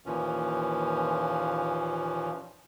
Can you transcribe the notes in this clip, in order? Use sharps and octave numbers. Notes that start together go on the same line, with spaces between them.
D#2 A#2 E3 F3 C#4